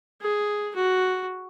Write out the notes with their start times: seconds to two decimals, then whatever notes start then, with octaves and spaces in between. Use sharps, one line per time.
0.22 G#4
0.76 F#4